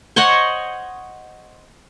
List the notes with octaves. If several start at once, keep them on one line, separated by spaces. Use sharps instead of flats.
C5 C#5 D#5 F#5